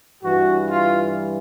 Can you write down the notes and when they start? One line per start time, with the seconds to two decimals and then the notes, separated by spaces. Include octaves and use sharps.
0.22 G2 E3 F#4
0.68 F4